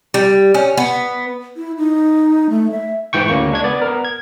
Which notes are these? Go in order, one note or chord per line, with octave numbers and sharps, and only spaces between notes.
G3
C#4
B3
E4
D#4
A3
E5
G#2 E3 G5 C#6
D2 C#3 A#3 C#6
G#3 D4 G#6
B3 D5
B3 A#4
G#6